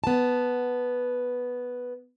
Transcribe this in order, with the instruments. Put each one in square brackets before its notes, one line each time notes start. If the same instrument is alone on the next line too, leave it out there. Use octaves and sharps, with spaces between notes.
[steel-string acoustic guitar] B3 A5